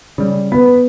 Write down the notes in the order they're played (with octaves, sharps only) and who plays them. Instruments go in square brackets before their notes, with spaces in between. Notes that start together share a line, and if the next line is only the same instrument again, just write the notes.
[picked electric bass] C#3 G3
[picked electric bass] B3 [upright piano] B4